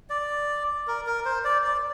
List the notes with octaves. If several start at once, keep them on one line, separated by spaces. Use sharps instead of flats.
D5
A#4
A#4
C5
D5
D5